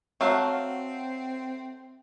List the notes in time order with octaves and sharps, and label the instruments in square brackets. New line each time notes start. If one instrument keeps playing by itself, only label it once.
[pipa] F#3 [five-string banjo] A3 F#4 F5 [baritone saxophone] C4